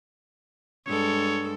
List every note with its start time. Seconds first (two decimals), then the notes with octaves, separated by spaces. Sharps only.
0.87 G2 G#3 A4 C#5